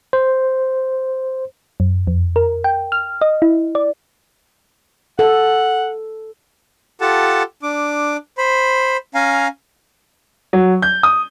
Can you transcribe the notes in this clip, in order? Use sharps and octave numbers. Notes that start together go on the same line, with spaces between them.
C5
F#2
F2
A#4
G5
F6
D#5
E4
D5
A4 F#5
F4 G4 A4 F#5 A5
D4 D6
C5 B5
C#4 F5 G#5 A#5
F#3
G6
D#6